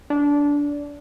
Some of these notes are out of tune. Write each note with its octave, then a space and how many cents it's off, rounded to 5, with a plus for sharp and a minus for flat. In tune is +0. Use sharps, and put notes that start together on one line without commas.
D4 -20